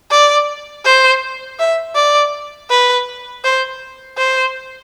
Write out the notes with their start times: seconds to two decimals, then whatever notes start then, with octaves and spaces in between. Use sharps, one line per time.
0.11 D5
0.85 C5
1.59 E5
1.96 D5
2.70 B4
3.44 C5
4.18 C5